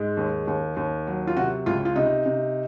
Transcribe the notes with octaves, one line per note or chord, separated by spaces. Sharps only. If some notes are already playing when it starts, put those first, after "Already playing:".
Already playing: G#2 G#3
D#2
D#2
D#2
F#3
F4
C3 F#4
C#2 F4
F4
C3 D#4
C3